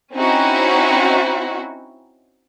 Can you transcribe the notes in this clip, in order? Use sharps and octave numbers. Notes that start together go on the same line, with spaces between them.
C4 C#4 D#4 E4 F#4